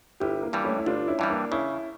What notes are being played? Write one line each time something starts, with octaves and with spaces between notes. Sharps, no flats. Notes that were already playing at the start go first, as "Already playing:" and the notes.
G1 E4 G4
A#3
G2 E3 G3
A3 C#4
E4
G1 D4 F4
C#4 E4
G2 E3 G3
A#3 D4
C#3 C#4 E4